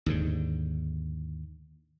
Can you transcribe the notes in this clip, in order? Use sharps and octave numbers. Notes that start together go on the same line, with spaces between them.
D#2 G#2 D3